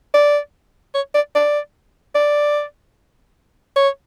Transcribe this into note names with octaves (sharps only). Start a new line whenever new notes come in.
D5
C#5
D5
D5
D5
C#5